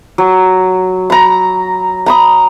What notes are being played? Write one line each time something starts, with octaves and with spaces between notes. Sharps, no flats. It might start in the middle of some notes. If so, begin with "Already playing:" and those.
F#3
A#5 B5
A#5 B5 D#6